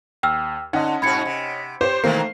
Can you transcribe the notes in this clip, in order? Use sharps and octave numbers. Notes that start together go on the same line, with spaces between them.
D#2 G5 E6 F6
D3 C#4 D#4 D#5 F#5
G#2 B2 F#4 B5 G#6 C#7
C3
G4 C5 C#5
B2 D#3 E3 A3 A#3 C5 C7